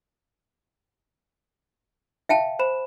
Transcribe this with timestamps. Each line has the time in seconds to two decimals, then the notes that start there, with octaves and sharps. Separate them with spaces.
2.29 E5 F5 G5 A5
2.59 C5 B5 E7